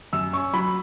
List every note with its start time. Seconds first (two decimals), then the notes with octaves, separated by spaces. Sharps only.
0.13 F#2 E6
0.33 C#4 C#6
0.53 F#3 B5